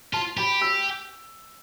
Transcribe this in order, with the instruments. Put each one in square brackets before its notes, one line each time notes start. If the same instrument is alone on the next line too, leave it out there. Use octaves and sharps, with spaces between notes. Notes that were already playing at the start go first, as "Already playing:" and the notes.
[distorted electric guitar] F4 [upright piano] A5
[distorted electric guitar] G4 [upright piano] B5
[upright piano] E6